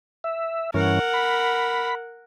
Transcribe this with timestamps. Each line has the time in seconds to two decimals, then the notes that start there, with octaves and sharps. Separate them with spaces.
0.24 E5
0.74 G2 E3 C#4 A#4 F#5
1.14 B5